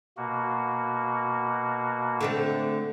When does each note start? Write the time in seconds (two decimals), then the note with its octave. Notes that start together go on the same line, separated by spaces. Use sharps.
0.17 B2 A#3 F#4
2.21 D3 A3 C4